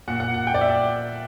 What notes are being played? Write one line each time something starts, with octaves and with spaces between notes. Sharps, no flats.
A#2 F#5
F#5
F#5
G5
D5
E5